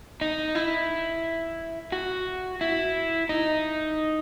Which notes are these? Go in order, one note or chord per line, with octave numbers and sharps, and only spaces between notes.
D#4
E4
F#4
E4
D#4